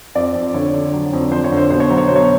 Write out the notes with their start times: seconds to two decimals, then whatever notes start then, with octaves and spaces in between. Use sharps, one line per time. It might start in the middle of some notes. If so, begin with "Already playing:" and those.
0.15 F2 D5
0.35 F2
0.54 D3 C#5
0.74 D3
0.93 F#3
1.13 F2
1.32 F2 C5
1.44 C#5
1.52 D3
1.57 C5
1.70 B2 C5
1.80 C#5
1.89 F#3 C5
1.98 C#5
2.08 B2 C5
2.16 C#5